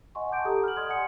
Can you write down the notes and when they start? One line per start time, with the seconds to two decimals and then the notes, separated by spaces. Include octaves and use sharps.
0.15 D#5 F#5 G#5 C6 C#6
0.29 F#5 G#5 A5 D6 G6 D7
0.45 G4 A4 A#5 B5 D#6
0.64 F6 F#7
0.76 D5 D#5 C6 D#6 G#6
0.89 F#5 G#5 D#6 C#7